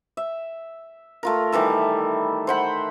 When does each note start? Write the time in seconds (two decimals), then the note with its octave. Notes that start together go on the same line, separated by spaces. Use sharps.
0.17 E5
1.23 A3 F4 A#4
1.52 D#3 E3 G3 A4
2.47 C5 F#5 B5